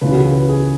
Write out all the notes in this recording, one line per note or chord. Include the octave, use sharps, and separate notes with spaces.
C#2 C#3 E3 B4
F#4
G#4
B4
G#4